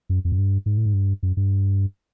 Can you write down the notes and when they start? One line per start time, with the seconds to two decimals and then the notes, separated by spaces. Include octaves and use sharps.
0.09 F#2
0.25 F2
0.32 F#2
0.38 G2
0.66 G#2
0.77 A2
0.86 G#2
0.94 G2
1.23 F#2
1.37 G2